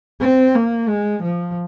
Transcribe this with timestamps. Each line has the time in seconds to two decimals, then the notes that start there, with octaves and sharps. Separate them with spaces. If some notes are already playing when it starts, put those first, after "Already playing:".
0.21 C4
0.55 A#3
0.89 G#3
1.23 F3